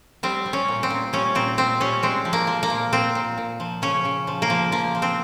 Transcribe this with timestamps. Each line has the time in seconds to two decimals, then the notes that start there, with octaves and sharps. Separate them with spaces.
0.23 G3 C4
0.46 G3
0.53 C#4
0.68 A#2
0.83 C4
0.90 A#2
1.13 G3 C#4
1.35 A#2 C4
1.58 G3 C4
1.80 G3 C#4
2.03 G#3 C4
2.25 F3
2.33 A#3
2.47 F3
2.63 A#3
2.70 A#2
2.92 A#2 C4
3.15 A#2
3.38 A#2
3.60 F3
3.82 C#3 C#4
4.05 C#3
4.27 F3
4.42 A#3
4.50 F3
4.72 F3 A#3
4.95 F3
5.02 C4